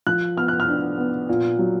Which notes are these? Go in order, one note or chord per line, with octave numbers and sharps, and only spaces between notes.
F3 F#6
B3 F6
F#6
F6
D4
B3
A#2
F#3